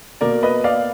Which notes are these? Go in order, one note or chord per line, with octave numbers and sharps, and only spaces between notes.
B2 A#3 A#4 D5
B4 D#5
D5 F5